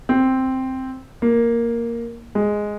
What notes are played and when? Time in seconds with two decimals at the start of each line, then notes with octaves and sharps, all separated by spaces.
0.09 C4
1.22 A#3
2.35 G#3